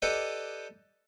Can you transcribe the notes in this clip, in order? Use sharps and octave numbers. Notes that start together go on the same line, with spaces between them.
G4 A4 B4 D5 D#5